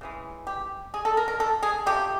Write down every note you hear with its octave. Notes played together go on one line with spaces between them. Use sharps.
C#3 E3 G#3
G4
G#4
A4
A#4
A#4
A4
G#4
C3 F3 A3 G4